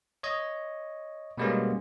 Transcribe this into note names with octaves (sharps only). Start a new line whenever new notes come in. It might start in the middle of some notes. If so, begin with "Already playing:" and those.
C#5 D#5
B2 G3 G#3 A#3 B3 C#4